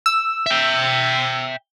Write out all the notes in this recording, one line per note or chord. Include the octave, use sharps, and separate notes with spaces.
E6
E5 G5